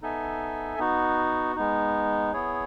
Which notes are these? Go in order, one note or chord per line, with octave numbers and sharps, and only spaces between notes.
B3 D#4 A4 E5 G#5
B3 D#4 F#4
G#3 B3 D#4
B3 E4 G#4 C#5